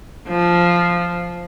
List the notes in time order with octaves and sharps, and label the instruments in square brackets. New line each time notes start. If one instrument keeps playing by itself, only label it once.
[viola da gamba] F3